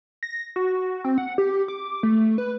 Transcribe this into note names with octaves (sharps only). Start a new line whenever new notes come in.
A#6
F#4
C4
F#5
G4
D6
A3
B4